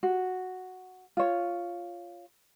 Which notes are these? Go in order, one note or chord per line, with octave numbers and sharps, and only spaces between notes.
F#4
F4 C#5